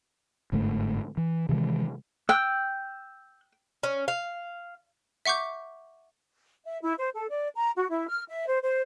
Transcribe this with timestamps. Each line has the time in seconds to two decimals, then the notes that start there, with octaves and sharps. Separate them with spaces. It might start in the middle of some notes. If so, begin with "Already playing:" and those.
0.52 G1 G#2 D3 A3
1.17 E3
1.49 C3 D#3 E3 G#3
2.29 G5 E6 F#6 G6
3.83 C#4
4.08 F5
5.26 E5 F#5 C#6 D6 G6
6.65 E5
6.82 E4
6.98 C5
7.13 A4
7.29 D5
7.56 A#5
7.77 F#4
7.90 E4
8.08 F6
8.29 E5
8.46 C5
8.62 C5